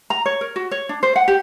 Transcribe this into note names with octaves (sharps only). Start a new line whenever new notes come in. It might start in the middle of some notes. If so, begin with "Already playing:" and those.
A#5
C#5
A#4
F#4
C#5
D4
C5
F#5
G4